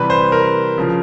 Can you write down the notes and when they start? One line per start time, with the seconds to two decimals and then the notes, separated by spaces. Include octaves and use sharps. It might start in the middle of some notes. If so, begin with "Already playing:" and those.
Already playing: C3 E3 G3 B4
0.10 C5
0.32 A#4
0.78 C#3 F3